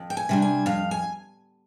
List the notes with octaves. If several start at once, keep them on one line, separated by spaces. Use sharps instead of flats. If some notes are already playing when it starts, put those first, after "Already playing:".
Already playing: F2
G5
G#5
C3 G3 D4
G#5
F2 F5
G#5